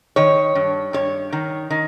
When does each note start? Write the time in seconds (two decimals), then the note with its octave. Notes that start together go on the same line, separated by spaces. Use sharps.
0.16 D#3 C#5
0.55 G2
0.93 G2 C#5
1.33 D#3
1.70 D#3